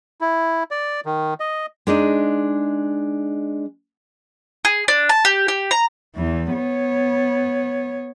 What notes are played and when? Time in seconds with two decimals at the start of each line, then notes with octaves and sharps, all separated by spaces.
0.21 E4
0.71 D5
1.06 D#3
1.40 D#5
1.87 G#3 D4 D#4 D#5
4.65 G#4
4.88 D4
5.09 A5
5.25 G4
5.48 G4
5.71 A#5
6.16 E2 E3
6.54 B3 C#5